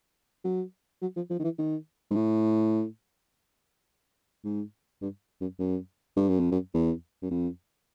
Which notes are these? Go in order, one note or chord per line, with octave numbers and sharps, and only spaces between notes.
F#3
F#3
F3
F3
D#3
E3
D#3
G#2
A2
G#2
G2
F#2
F#2
G2
F#2
F2
F#2
E2
F#2
F2